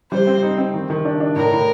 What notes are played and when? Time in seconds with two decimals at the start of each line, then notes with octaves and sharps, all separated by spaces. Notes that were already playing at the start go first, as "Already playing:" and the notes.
0.11 G3 C5
0.27 C4
0.43 D#4
0.58 C4
0.74 D#3
0.90 D#3
1.05 D4
1.20 D4
1.36 A2 A#4
1.52 A2